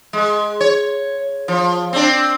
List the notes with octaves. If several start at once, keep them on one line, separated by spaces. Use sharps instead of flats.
G#3
C#5
F3
C4 D4